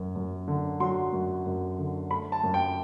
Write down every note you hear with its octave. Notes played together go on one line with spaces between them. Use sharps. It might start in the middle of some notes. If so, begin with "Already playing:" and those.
Already playing: F#2 F#3
F#2
D3
F#3 C6
F#2
F#2
D3
A3 B5
A5
F#2
G5